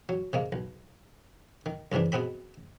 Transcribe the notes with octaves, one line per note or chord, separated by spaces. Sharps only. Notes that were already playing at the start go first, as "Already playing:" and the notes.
F#3
C3 G#3 A#3
B1
D#3
C2 G#2 C3 E3 D4
B2 G#3 B3 C4 B5